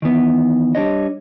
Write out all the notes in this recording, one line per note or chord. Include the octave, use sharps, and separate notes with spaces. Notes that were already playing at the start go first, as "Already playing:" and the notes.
D#3 E3 B3
G3 D4 C#5 D#5